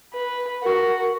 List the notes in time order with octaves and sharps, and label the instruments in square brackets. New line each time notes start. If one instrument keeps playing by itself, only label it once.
[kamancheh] B4
[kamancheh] F#4 [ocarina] A#4